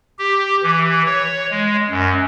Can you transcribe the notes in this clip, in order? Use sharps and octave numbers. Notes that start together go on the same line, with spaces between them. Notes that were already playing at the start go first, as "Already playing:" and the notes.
G4
E3
C#5
G#3
F#2